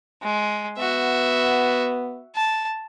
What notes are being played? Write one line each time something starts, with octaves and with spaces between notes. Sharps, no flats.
G#3
B3 F#4 E5
A5